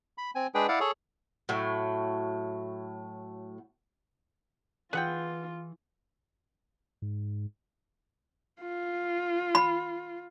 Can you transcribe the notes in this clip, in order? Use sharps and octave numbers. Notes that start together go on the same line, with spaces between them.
B5
C4 G#5
G#3 D4 G#4 B4 G5
E4 D5 F5 F#5
G#4 A4 C#5
A2 F#3
E3 F4 G#4 B4 F#5 G5
G#2
F4
B5